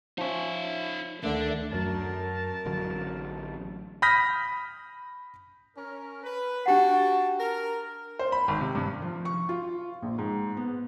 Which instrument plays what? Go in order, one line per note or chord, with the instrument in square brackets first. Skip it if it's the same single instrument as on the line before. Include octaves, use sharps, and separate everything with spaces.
[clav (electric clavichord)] F3 C#4 [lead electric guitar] D#4 E5
[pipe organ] D2 D#3 A3 [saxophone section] D3 [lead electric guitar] D4
[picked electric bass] F#2 F#3 [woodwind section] A#4 A5
[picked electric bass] A1 D3 F#3
[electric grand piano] B5 D#6 F6 G6 A#6 B6
[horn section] C#4 A#4
B4
[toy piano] D4 G4 F#5 [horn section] F#4 G5 A5
[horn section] A#4
[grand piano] C5
B5
G#1
C3
G2
[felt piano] F3
C#6
F4
A#1
G#2
B3